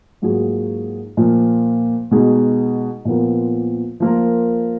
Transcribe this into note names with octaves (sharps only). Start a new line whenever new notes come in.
G#2 F#3 A#3 F4 G#4
A#2 F3 A#3
B2 G#3 D#4 G#4
A#2 F3 B3 F4 A#4
F3 A#3 F4 A#4